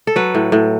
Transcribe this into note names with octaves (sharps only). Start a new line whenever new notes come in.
A4
F#3 B4
A2
A2